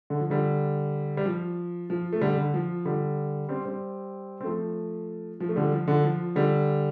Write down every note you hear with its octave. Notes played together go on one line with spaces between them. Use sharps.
D3
F3
D3 G3
G3
F3
F3
A3
D3 G3
D3
F3
D3 G3
G3 C4
G3 C4
C4
F3 A3
F3
A3
D3 G3
F3
D3
F3
D3 G3